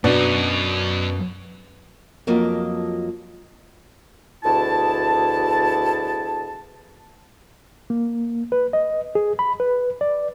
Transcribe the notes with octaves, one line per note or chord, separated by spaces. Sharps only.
F#2 B2 B3 D4 F#4
F2 F3 F#3 A#3 D#5
D2 B2 E4 G#4 A5
A#3
B4
D#5
G#4
B5
B4
D5